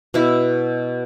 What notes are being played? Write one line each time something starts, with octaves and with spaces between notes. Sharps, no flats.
B2 E4